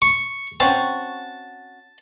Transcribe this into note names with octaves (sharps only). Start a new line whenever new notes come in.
C#6
C4 C#4 F#4 A5